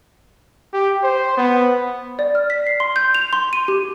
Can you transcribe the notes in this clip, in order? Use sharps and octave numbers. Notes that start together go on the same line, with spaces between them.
G4
C5
B3
D5
F6
B6
C7
C6
G6
F7
C6
D#7
G4